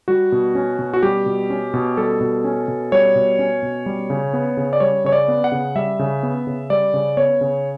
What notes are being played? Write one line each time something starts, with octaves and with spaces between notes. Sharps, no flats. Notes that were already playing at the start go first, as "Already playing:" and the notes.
G3 F#4
B2
C#4
B2
F#4
G3 G4
B2
C#4
B2
G3 A4
B2
C#4
B2
G3 C#5
B2
C#4
B2
G3
C#3
B3
C#3
D5
G3 C#5
C#3 C#5
D5
B3
F#5
C#3
G3 E5
C#3
B3
C#3
G3 D5
C#3
B3 C#5
C#3